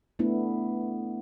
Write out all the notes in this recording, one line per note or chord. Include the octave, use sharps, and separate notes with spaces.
A3 B3 D4 E4